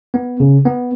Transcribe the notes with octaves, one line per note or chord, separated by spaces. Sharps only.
B3
C#3
B3